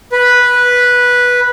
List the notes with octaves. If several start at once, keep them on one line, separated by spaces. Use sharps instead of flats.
B4